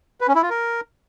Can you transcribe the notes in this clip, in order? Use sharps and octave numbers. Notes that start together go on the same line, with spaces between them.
B4
C#4
E4
F4
A#4